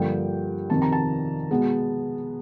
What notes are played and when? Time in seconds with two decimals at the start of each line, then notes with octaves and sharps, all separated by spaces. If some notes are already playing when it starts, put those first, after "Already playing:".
Already playing: G2 D3 F3 A#3 G5
0.70 F2 C3 D#3 A5
0.82 A#5
0.92 A5
1.51 B2 G#3 B3